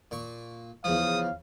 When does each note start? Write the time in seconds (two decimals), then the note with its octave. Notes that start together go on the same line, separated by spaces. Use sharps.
0.11 A#2 C#6
0.84 E2 C#3 F3 F5 D#6